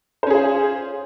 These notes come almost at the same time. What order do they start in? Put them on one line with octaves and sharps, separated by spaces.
C5 C#4 G#4 F4